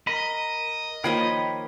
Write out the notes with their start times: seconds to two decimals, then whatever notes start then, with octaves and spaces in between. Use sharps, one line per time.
0.07 A#4 D#5 B5
1.04 D#3 F3 A#3 A#4 C#5 G5 B5